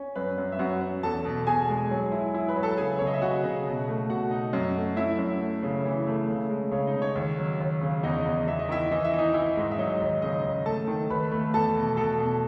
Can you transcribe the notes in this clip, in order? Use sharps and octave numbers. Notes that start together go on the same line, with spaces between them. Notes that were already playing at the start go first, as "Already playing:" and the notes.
Already playing: C#4
F#2 B4
F#2
E5
F#2 F#4 F#5
F#2
E2 A4 A5
B2
B2 G#4 G#5
G#3
F#3
E4
E4
B4 B5
F#3
A4 A5
C#3 G#4 G#5
C#3 C#5
D#5
E5
C#3 F#4 F#5
C#3
B2
A3
B2 F#4 F#5
D#4
F#2
A3
F#2 E4 E5
F#2
A3
C#3
E3
A3
C#3
G#3
C#3 C#5
D#4 D#5
C#3
C#5
D#2
F#3
D#2
C#3
E2 D#4 D#5
E2
E2 E5
D#5
D#3 E4 E5
E3 D#5
E5
E3
D#4 D#5
E3 E4 E5
G#2
E5
F#3 D#4 D#5
D#2
C#3 D#4 D#5
D#2
A3 A4 A5
D#3
D#2 B4 B5
A3
E2 A4 A5
B2
B2 A4 A5
B2